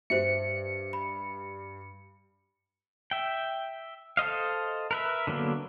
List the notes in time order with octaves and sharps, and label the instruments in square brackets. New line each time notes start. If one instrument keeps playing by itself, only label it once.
[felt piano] G2 G3 [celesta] C5 E5 [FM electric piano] C#7
[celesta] B5
[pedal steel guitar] E5 G5
A4 C5 D#5 F5
A#4 B4 E5
D3 F#3 A#3 B3